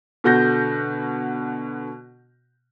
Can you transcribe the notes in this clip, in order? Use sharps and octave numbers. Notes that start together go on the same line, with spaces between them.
B2 D3 F#4 G6 A#6